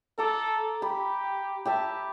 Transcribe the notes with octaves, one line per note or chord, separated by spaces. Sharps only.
A4 A#5 D6
G4 B5
G4 E5 A5